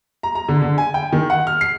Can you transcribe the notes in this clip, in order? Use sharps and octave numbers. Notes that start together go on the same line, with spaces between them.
A#5
A#5
D3
D3
G#5
G5
D#3
F#5
F6
C7